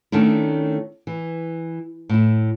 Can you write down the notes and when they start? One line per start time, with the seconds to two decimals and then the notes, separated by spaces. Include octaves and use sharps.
0.12 D#3 A3 C#4 D4 E4
1.07 E3
2.09 A2 E4